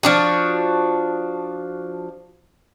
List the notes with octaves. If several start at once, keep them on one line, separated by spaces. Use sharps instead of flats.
F3 D4 F#4